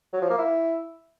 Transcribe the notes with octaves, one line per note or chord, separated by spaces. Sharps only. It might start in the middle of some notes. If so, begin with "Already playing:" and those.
F#3
F3
A#3
E4